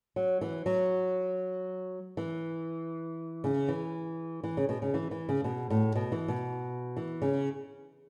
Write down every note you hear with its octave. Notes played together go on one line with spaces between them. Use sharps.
F#3
E3
F#3
E3
C#3
E3
E3
C#3
B2
C#3
E3
E3
C#3
B2
A2
B2
E3
B2
E3
C#3